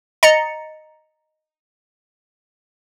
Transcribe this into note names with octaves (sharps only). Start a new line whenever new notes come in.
D#5 A#5 A6 C#7